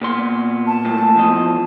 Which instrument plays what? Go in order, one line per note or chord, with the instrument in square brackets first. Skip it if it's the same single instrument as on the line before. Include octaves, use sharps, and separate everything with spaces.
[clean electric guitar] A#2 B3 C6
[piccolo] A5
[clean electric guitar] A#2 A3
E2 F3 D#5